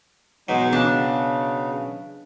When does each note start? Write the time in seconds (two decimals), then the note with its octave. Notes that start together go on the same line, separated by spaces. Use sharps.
0.49 B2 F#3 G#3 D#4
0.73 C#3 D4